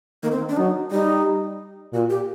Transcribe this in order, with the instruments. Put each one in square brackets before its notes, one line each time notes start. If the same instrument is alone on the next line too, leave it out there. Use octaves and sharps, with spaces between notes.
[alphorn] D#3 [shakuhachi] A#3
[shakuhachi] C4
D4
[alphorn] F#3 [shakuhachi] D#4
[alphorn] G3 [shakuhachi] D#4
[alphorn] A#2 [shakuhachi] F#4
[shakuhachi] G4